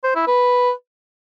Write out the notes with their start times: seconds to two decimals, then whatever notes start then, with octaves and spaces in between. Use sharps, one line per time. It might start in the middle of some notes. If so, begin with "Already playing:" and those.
0.04 C5
0.15 E4
0.27 B4